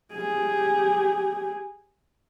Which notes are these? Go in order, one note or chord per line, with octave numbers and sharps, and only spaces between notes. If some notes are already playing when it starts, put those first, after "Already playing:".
G4 G#4